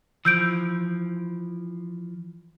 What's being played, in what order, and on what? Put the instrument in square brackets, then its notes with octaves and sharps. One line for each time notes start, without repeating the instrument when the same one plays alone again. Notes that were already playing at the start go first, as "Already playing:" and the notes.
[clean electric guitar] E3 F3 [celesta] E6 G6 D7